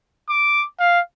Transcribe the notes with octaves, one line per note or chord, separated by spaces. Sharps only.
D6
F5